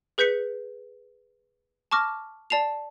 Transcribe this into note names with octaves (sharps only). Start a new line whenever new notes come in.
G#4 B4 G6 B6 C#7
A5 C#6 D6 F6 A#6
D5 A5 C7 F7